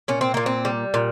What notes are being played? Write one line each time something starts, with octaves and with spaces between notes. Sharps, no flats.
A#2 C#4
C4
A#2 A#3
C4
G3
A#2